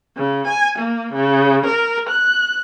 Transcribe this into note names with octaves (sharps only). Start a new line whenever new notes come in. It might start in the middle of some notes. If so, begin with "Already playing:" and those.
C#3
G#5
A#3
C#3
A#4
F#6